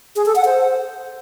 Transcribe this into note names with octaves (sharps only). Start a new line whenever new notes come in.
G#4
A4
F#5
C5